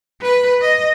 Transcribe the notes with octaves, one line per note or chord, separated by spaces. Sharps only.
B4
D#5